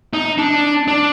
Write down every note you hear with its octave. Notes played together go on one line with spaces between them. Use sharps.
D#4
D4
D4